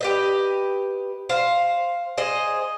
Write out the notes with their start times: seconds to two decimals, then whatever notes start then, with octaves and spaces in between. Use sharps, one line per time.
0.01 G4 B4 D#5
1.29 C5 F5
2.17 G#4 C5 D#5